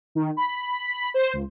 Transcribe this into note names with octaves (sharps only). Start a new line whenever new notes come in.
D#3
B5
C5
C#2